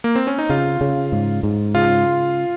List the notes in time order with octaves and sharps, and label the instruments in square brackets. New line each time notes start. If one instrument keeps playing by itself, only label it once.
[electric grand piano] A#3
C4
C#4
D#4
[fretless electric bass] C#3 [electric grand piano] F4
[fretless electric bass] C#3
G#2
G#2
[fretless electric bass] C#3 [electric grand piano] F4